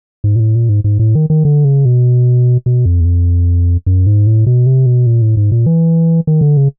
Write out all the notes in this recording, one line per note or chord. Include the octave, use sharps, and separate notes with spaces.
G#2
A#2
A2
A#2
G#2
G#2
A2
D#3
D#3
D3
C#3
B2
B2
F2
E2
F2
F#2
G#2
A2
B2
C3
B2
A#2
A2
G#2
A#2
E3
D#3
D3
C#3